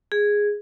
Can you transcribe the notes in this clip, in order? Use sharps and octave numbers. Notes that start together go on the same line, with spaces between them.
G#4